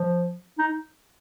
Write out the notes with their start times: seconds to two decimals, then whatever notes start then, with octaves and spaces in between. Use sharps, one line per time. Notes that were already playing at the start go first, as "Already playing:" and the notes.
Already playing: F3
0.59 D#4